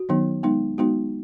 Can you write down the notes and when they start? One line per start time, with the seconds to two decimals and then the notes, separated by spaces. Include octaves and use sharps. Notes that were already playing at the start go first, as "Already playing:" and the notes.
Already playing: F#4
0.09 D#3 F#3 B3 D#4
0.43 G#3 B3 D#4
0.78 G#3 B3 D#4 F#4